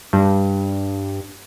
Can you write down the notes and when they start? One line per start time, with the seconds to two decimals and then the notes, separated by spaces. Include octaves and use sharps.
0.13 G2